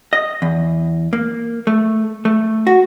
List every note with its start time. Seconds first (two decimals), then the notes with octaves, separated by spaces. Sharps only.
0.13 D#5
0.42 E2
1.13 A#3
1.67 A3
2.25 A3
2.67 F#4